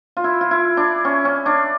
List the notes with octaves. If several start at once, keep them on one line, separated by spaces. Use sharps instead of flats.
F4
E4
F4
E4
D4
C#4
C#4
D4